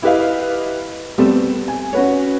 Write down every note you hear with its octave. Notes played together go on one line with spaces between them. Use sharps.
E4 G4 B4 D#5 F5
G3 A3 B3 C4 A4
G#5
C#4 F#4 B4 C#5